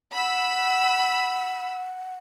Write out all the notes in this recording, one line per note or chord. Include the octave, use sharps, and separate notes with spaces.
F#5 B5 E6